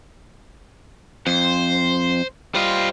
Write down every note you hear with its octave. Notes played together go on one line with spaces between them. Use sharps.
F2 C5
G3 F4 C5 D#5